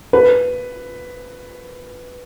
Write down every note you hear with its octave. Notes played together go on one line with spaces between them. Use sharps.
B4